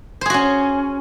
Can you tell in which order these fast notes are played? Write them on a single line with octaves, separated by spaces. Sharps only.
C5 G#4 F#4 C#4